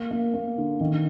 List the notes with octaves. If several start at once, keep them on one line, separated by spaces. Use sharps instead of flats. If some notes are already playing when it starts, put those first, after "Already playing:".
Already playing: A#3
A#3
A#3
D3
D#3